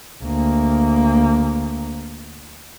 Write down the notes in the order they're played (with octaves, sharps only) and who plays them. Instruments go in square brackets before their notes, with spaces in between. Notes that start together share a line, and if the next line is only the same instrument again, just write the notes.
[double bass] D2 A#3